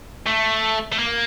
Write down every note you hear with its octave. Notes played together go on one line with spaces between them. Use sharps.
A3
A3
A#3